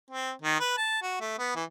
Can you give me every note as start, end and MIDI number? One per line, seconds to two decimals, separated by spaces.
0.10 0.32 60
0.42 0.59 51
0.60 0.75 71
0.77 0.99 81
1.02 1.16 66
1.21 1.37 57
1.39 1.55 59
1.56 1.64 52